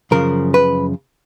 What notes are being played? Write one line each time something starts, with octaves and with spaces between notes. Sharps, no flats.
F#2 C#3 F3 A#4
B4